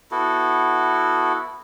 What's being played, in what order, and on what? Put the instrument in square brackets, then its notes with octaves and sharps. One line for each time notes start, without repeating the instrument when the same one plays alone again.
[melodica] B3 E4 F#4 A4